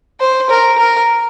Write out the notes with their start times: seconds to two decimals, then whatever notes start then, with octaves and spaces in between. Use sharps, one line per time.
0.20 C5
0.50 A#4
0.78 A#4